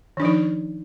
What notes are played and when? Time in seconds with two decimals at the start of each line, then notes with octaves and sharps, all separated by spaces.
0.17 D#3
0.20 D4
0.22 F3
0.25 D#4